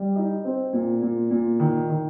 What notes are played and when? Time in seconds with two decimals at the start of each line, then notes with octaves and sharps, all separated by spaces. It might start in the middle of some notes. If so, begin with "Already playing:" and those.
Already playing: G3
0.16 D#4
0.45 C4
0.73 A#2
1.02 A#2
1.31 A#2
1.60 D#3
1.89 D#3